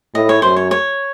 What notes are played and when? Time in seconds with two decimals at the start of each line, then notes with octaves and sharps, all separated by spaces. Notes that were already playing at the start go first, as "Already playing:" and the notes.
0.15 A2 D#5
0.29 C#5
0.42 F#2 C5
0.56 C#5
0.71 C#5